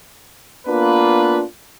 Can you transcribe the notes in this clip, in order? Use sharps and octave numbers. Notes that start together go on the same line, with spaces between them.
A#3 B3 D4 F4 B4